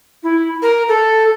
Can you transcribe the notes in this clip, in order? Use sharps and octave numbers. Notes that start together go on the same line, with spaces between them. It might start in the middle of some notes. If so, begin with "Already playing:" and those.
E4
A#4
A4